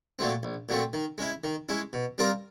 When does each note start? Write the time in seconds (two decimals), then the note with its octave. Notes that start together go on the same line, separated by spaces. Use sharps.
0.19 A#2 F#3 A3 C4
0.43 A#1
0.69 A#2 F#3 A3 C4
0.93 D#3
1.18 G#3 C#4 E4
1.44 D#3
1.69 G#3 C#4 E4
1.93 B2
2.18 G3 C4 F4 A#4